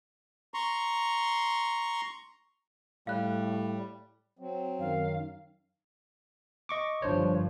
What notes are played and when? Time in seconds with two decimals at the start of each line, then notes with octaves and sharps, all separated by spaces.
0.54 A#5 C6 C#6
3.07 A2 G3 F5 F#6
4.39 F#3 C4
4.80 F#2 D#3 F5
6.69 D#5 C#6 D6
7.02 G1 G2 F3 D4 C5 C#5